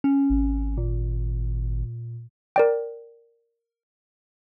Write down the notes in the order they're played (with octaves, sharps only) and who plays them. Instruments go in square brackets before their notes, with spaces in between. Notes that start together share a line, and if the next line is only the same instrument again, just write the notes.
[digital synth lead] C#4
[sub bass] G#1
[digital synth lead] A#2
[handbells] A#4 D5 G5